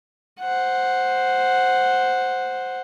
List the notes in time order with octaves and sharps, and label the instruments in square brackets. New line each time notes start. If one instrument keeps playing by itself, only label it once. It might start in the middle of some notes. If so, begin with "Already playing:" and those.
[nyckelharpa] C5 F#5